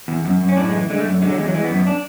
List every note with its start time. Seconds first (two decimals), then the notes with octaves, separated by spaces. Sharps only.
0.08 E2
0.25 F#2
0.41 F#2
0.49 C#4
0.56 A2 D4
0.68 G#3
0.73 E3
0.90 D3 G#3
1.00 A3
1.05 F#2
1.22 D3 G#3
1.29 F#3
1.38 E2 G#3
1.45 F#3
1.54 E3 G#3
1.64 B3
1.70 F#2
1.75 B3
1.87 D4